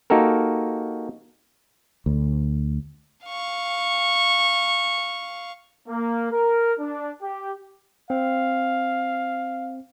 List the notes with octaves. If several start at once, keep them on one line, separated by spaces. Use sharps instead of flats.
A#3 D#4 F#4 G4 A4 A#4
D2
F5 C#6
A#3
A#4
D4
G4
C4 F5